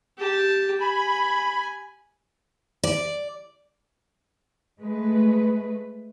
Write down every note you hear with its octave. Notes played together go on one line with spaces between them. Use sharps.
G4 A5
G#5 B5
D5
G#3 A3 B4